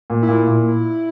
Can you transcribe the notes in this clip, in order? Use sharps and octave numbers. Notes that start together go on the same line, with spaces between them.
A#2
E4
A#2
A#2